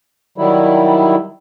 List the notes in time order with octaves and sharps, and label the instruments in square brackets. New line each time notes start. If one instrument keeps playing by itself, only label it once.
[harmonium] D#3 F#3 G3 E4